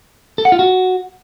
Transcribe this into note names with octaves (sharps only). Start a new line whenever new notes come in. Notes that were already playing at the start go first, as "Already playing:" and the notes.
A4
F#5
F4
F#4